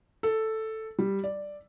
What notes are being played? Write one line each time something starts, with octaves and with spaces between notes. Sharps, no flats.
A4
G3
D5